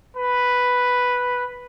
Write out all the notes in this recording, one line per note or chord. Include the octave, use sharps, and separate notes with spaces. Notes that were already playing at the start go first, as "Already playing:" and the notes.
B4